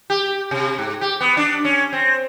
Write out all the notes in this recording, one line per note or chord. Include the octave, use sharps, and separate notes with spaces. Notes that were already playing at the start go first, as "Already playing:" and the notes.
G4
C3
G#2
G4
B3
D4
C#4
C4